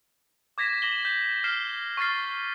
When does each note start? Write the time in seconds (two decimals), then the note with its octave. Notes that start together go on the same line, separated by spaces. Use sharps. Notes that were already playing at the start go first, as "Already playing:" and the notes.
0.58 D6 G#6 A#6 B6 E7
0.82 D6 A#6 E7 F#7 G7
1.05 G6 B6
1.44 F6 C7 E7
1.97 C#6 F6 A6 C7